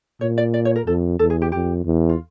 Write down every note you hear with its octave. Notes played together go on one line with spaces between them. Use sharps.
A#2 C#5
D5
D5
C#5
A#4
F2 A4
E2 A4
G#4
G4
F2 G4
E2
F4